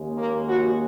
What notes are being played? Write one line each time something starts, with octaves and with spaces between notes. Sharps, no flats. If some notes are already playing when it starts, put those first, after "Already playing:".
Already playing: D#2 C#3 G#3
A#3
F#4